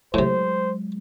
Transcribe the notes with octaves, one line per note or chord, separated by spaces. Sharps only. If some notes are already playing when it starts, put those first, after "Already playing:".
A2 C3 F#3 G#3 C5